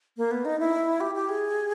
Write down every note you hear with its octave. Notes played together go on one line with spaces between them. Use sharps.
A#3
B3
D#4
E4
G4
G4
G#4